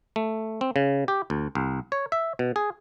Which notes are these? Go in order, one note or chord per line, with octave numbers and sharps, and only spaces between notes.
A3
C4
C#3
G4
D2
C2
C#5
E5
B2
G#4